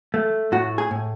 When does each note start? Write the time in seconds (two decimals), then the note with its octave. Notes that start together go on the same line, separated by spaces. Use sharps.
0.14 A3
0.52 A2 F#4
0.78 G#4
0.91 A2